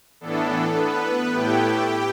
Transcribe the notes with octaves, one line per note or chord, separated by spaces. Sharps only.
A2 E3 B3 D4 A4
B3 B4
A2 A3 E4 G4 G5